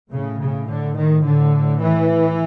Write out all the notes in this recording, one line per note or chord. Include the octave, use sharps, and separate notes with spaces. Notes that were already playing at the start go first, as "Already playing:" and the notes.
A2 C#3
C#3
D3
D#3
A2 D3
E3